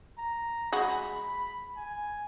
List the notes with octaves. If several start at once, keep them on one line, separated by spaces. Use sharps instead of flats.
A#5
G#3 F#4 B5
G#5